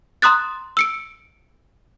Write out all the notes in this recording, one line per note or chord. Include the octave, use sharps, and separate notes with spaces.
A#5 C6 D#6 F#6 A6
E6 C#7 D7